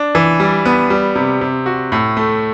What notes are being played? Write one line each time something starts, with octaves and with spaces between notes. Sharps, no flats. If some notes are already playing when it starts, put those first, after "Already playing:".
Already playing: D4
E3
G3
B3
G3
C3
C3
F#4
A2
A3